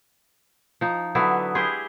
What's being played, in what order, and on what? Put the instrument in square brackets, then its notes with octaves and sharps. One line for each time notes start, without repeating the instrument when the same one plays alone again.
[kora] F3 D#4
[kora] D3 F#3 E4 [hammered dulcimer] B3
[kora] E4 G4 G#4 [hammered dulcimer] C6